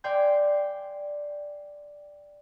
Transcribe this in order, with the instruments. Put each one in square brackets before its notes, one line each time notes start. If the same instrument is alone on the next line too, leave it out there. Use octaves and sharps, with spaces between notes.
[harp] D5 F5 G5 G#5 C6 G6